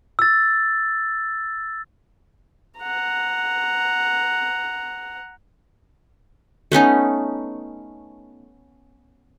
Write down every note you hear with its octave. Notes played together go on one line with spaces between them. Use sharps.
E6 A6
F#5 A#5
A3 B3 C#4 D#4